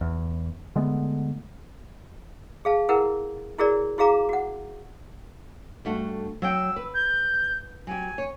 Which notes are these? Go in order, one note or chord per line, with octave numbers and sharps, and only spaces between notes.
E2
D3 G#3 A3 B3
G#4 F5 A5
E4 G#4 A#4 B4 F#5
E4 F#4 G#4 A#4 C#5 D5
E4 F#4 G#4 F5 A#5 D6
F#4 F#5
G2 A3 F#4
F#3 F#5 G5 E6
B4
G6
F#3 G4 G#5
C#5